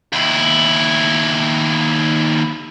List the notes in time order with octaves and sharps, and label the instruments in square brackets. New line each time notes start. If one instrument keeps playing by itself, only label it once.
[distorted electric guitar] D#2 E4